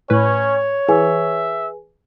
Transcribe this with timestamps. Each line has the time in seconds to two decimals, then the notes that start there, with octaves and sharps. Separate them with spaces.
0.10 A2 C#4 B4 C#5
0.89 E3 G#4 B4 E5 G#5